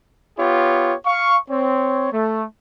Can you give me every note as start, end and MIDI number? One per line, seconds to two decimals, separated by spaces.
0.38 0.94 59
0.38 0.94 65
0.38 0.94 67
0.38 0.94 73
1.06 1.37 77
1.06 1.37 85
1.50 2.09 60
1.50 2.09 73
2.11 2.44 57